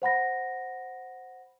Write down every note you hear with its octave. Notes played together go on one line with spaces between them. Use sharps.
C5 F#5 B5 A#6